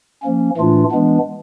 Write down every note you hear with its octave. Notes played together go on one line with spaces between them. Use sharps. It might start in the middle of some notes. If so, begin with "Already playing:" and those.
F3 A#3 C#4
A2 E3 A3 D4 F4
E3 G#3 B3 D4